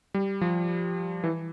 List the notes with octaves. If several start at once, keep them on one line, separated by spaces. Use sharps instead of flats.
G3
F3
E3